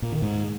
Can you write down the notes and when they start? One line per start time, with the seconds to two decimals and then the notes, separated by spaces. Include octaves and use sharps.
0.02 A#2
0.12 D#3
0.22 G#2